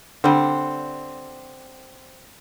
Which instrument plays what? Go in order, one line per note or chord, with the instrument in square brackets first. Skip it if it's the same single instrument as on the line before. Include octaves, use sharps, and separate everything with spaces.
[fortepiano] D3 [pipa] G3 C4